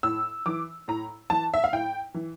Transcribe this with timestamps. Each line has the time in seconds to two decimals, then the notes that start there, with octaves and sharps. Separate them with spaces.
0.03 A2 E6
0.46 E3 D6
0.88 A2 A#5
1.30 E3 A5
1.54 E5
1.64 F5
1.73 A2 G5
2.14 E3